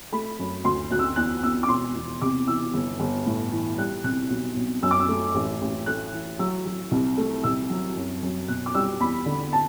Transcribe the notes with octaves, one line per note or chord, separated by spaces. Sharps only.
A3 B5
F#2
D2 C6
D2 F#6
E6
E2 F#6
E2 E6
D6
E1 C6
E2
C3 D6
E3 E6
G1
G1
A2
E3
G3 F#6
C2 F#6
B1
B1
F#2 E6
D6
E6
A3
A1
A1
A3 F#6
E3
F#3 E6
F#3
C2
A3
C2 E6
F#3
F#2
F#2
B2 F#6
D6
G3 E6
E2 B5
D3
A5